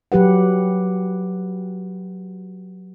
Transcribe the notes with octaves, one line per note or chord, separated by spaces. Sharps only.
F#3 G4 B4 F#5